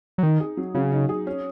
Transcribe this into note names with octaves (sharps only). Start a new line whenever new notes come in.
F#3
D#3 D#4
G#4
F#3
C#3 F#3
D#4
G#4
C#4